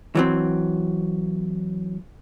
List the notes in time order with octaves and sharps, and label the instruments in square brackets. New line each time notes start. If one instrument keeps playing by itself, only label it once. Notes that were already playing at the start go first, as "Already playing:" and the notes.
[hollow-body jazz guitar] E3 F#3 C4